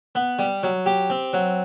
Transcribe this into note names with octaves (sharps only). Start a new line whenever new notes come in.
B3
G3
F#3
G4
C4
F#3